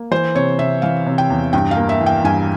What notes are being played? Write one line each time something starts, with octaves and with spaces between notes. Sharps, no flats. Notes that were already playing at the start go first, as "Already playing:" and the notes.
Already playing: A#3
E3 C5
C3 C#5
C3 E5
E3 F5
C3
G5
E2
G2 G5
F5
A#3
E5
E3
G5
G2 G#5